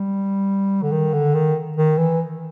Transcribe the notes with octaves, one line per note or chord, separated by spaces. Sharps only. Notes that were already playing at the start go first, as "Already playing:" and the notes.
Already playing: G3
D3
D#3
D3
D#3
D#3
E3